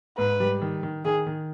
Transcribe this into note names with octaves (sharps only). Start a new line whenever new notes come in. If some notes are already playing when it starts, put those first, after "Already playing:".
G#2 B4
G3
D#3
D#3
D#3 G#4
D#3